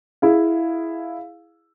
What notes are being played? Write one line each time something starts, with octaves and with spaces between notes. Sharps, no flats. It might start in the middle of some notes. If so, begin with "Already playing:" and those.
E4 G#4 F5